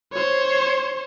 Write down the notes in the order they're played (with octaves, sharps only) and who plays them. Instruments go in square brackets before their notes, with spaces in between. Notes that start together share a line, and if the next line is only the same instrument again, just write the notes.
[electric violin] C5 C#5